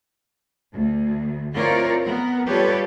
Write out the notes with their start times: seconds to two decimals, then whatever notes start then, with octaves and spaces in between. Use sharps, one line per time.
0.73 D2
1.55 C4 E4 F4 A#4 C#5 D5
2.00 B3 A#4
2.47 G3 F4 G4 A4 B4 C#5